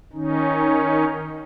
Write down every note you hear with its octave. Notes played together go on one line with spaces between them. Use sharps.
D#3 C#4 D#4